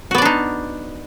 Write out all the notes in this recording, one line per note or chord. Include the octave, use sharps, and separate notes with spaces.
B3 D4 D#4 F#4 D5